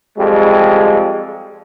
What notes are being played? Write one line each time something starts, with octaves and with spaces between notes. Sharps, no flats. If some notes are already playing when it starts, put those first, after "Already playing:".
F2 G3 G#3